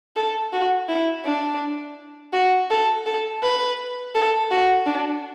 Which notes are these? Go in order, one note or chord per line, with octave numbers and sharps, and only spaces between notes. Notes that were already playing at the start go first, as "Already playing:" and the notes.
A4
F#4
E4
D4
F#4
A4
A4
B4
A4
F#4
D4